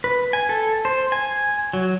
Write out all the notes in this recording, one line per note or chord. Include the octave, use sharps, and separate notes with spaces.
B4
G#5
A4
C5
G#5
F#3